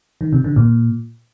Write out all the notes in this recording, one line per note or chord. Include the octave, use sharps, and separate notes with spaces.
D#3
C3
D3
A#2